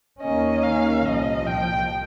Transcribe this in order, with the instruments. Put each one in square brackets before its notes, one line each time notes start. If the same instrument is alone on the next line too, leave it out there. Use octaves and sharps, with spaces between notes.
[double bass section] D#2 D#3 A#3 C#4 [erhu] D#5
[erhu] F5
[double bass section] C2 A#2 F3 [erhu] D#5
[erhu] G5